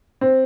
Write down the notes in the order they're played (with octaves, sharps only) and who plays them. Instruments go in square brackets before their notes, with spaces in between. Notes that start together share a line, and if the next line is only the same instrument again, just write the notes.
[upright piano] C4